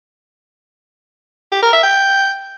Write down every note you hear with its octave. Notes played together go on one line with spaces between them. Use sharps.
G4
A#4
E5
G5